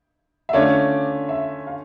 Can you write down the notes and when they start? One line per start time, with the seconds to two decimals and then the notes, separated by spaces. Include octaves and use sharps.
0.49 E5
0.53 D3 A3 C#4 F4 C#5 D5
1.29 E5
1.67 F5